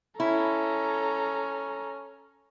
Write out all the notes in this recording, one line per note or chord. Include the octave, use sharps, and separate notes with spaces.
C#4 E4 A4 A#5